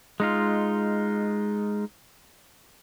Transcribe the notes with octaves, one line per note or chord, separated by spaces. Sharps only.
G#3 D#4 F4